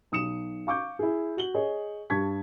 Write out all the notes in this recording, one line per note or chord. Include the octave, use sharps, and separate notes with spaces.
B1 D#6 C#7 E7
F5 C#6 D6 G6
E4 G#4
F#4 F#7 G7
G#4 C#5 D#5
G2 A5 C#6 G#6 B6